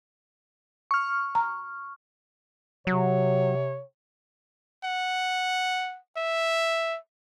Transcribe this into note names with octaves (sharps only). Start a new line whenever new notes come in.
C#6 F6
A#5
C3 F#3 C#5
F#5
E5